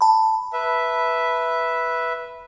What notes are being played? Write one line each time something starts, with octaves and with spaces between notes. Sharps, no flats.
A5 B5
B4 E5